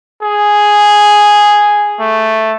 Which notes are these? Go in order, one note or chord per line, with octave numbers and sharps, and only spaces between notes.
G#4
A3